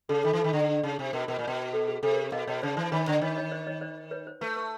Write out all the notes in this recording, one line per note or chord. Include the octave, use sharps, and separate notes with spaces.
C#3 A4
D#3 A4
E3
A4
D#3
D3
C#3
C3
B2 A#4
B2 A#4
A#2
B2
A4
G#4
C3 A4
A#4
B2 D#5 F5
B2 C#5 D#5
C#3 C5 D5
E3 C5 D5
D#3 B4 C#5
D3 C5 D5
D#3 C#5 D#5
C#5 D#5
C5 D5
C#5 D#5
C5 D5
B4 C#5
C5
A3 B4
B4